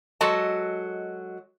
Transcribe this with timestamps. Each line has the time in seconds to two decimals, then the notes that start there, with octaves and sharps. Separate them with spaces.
0.21 F#3 G#3 F#4 A4 D#5 A5